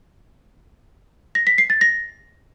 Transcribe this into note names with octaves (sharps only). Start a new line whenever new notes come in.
A#6
B6
C7
A6
A#6